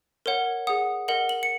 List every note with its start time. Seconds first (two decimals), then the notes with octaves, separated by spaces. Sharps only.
0.26 A#4 C#5 F#5
0.67 G#4 F#5 D#6
1.08 A#4 D#5 F#5 F#7
1.29 F#7
1.43 C#7